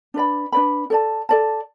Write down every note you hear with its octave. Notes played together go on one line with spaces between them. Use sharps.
D4 B4 D5 B5
D4 B4 D5 B5
A4 D5 A5
A4 D5 A5